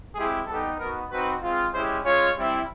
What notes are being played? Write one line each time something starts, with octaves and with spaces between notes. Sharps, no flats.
G#3 C4 E4 G4 G#4
G3 B3 D#4 G4 A4
B3 D#4 F#4 A#4
C4 D#4 F#4 B4
G#3 C4 F4
G#3 C#4 E4 G4 C5
G#3 C#4 F4 C#5
G3 C4 E4